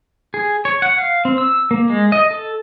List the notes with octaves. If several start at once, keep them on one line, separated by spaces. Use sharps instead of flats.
G#4
C#5
F#5
F5
C4
E6
A#3
G#3
D#5
A4